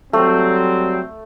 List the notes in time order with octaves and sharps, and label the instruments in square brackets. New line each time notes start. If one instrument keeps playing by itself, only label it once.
[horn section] F#3 G3 C4 [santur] A3